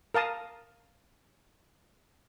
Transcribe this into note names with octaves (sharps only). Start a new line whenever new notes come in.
A#4 F5 A5 D#6